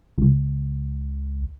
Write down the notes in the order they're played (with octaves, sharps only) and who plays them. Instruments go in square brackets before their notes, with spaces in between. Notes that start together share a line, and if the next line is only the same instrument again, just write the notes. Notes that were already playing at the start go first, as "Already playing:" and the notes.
[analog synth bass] C#2